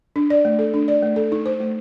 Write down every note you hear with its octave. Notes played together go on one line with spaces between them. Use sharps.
D4
D5
A3
A4
D4
D5
A3
A4
D#4
C5
A3